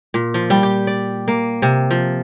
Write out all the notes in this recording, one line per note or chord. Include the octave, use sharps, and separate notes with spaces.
A#2
F3
G3
G4
D5
A#3
C3
F3